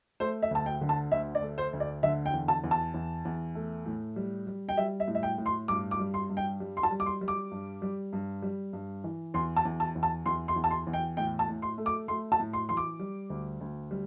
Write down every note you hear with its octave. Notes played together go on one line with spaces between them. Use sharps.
A3 C5
E5
D2 A5
G5
D3
A5
D2 E5
D5
A3
C5
D2
D5
D3 E5
G5
E2
A5
E2
A5
E2
E2
A3
A2
G3
G3
G5
G3 E5
E5
A2
E5
G5
A2
C6
G2 D6
D6
G3
C6
G2
G5
G3
C6
A5
G3
D6
C6
G3
D6
G2
G3
G2
G3
G2
E3
E2 C6
A5
E2
A5
E2
A5
E2 C6
C6
E2
A5
C6
E2
G5
A2 G5
A5
A2
C6
A3
D6
A3 C6
A5
A2
C6
E3 C6
D6
G3
D2
D2
G3